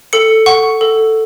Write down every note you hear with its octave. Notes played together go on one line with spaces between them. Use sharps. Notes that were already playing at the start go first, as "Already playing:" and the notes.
A4 C#7
F#5 C#6
A4